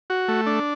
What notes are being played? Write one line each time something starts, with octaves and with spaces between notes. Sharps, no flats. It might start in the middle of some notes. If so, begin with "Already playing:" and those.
F#4
A3
D4